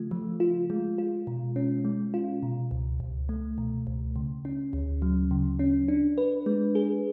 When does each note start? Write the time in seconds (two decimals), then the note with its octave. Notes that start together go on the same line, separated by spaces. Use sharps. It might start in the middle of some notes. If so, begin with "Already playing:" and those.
Already playing: C#3 F3 A3 F4
0.11 F3
0.40 F4
0.70 G#3
0.98 F4
1.27 B2
1.56 C#4
1.85 G#3
2.14 F4
2.43 B2
2.71 C#2
3.00 C#2
3.29 A3
3.58 B2
3.87 C#2
4.16 C#3
4.45 C#4
4.73 D2
5.02 F#3
5.31 C#3
5.59 C#4
5.88 D4
6.18 B4
6.46 G#3
6.75 G#4